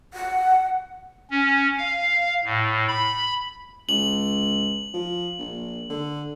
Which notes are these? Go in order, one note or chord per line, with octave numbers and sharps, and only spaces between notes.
F#5
C#4
F5
A2
B5
C#2 F#7
F3
A#1
D3